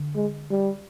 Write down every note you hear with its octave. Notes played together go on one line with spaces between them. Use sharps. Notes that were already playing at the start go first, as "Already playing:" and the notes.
Already playing: D3
G#3
G3